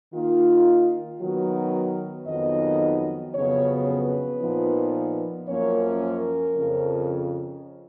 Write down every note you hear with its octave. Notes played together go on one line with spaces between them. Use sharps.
D#3 A#3 D#4 F4
D#3 F#3 B3 F#4
F2 D#3 F#3 B3 D#4 D#5
F2 C#3 F#3 B3 C#5
B4
A#2 F3 B3 D#4
F#2 F3 A#3 C#4 C#5
A#4
F2 C#3 F3